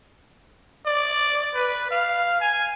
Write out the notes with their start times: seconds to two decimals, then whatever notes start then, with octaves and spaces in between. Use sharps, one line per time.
0.86 D5
1.55 B4
1.91 F5
2.41 G#5